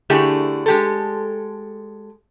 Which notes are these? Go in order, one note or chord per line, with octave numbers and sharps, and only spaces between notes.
D3 A3 E4 G4 G#4
G#3 G4 A4